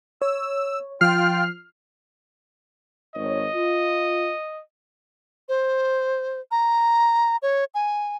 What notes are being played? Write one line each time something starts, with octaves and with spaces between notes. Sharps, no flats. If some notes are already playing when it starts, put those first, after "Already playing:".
C#5 E6
F3 F4 G5 F6 C7
G#1 C#5 D#5
F4
C5
A#5
C#5
G#5